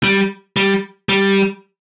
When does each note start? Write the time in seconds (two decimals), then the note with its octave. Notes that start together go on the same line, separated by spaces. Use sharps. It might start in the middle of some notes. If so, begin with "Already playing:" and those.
0.04 G3
0.57 G3
1.09 G3